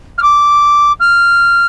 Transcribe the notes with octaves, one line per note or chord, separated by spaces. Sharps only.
F6
D6
F6